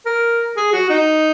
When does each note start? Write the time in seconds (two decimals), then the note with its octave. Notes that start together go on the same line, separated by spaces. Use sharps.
0.06 A#4
0.57 G#4
0.73 F#4
0.90 D#4